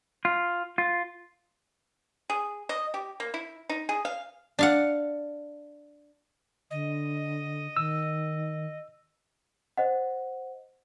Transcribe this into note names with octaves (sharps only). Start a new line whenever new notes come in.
F4
F4
G#4
D#5
G4
A#3
E4
D#4
G#4
F5
D4 F5 F#5
D3 D#5
D#3 E6
C5 D#5 F#5